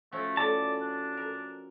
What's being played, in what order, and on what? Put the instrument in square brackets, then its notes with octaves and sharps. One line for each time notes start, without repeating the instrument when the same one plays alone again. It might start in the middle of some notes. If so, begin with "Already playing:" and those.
[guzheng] F3 C#4 F#4 [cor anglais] A3
[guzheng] A2 [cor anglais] D5 [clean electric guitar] A5
[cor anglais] D4
[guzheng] A#4